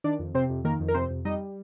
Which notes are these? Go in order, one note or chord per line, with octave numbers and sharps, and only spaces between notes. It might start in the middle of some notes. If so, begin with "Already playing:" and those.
D#3 D4 D5
F2
C3 C4 C5
F2
D#3 A#3 A#4
F2
A#4
C3 C4 C5
F2
G3 D#4 D#5